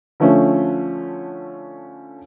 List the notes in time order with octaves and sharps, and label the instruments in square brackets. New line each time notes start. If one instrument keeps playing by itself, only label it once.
[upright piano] D3 F3 A3 C#4